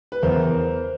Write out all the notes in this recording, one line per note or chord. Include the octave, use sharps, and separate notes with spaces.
B4
E2 A#4 C5